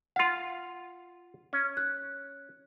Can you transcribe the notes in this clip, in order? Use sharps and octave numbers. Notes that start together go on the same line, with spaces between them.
F4 F5 F#5 C6
C#4
F#6